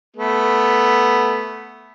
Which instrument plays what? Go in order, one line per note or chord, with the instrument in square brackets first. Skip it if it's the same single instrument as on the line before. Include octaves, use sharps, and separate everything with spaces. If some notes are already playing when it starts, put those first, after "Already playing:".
[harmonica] A3 B3